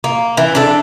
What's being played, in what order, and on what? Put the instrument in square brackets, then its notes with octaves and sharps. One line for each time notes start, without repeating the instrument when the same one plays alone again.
[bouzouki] A#3
E3
D4 A4